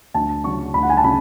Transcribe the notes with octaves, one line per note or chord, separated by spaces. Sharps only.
D2 A5
C#3 F#3 C#4 C#6
D2 B5
F#5
G#5
A5
C#3 B5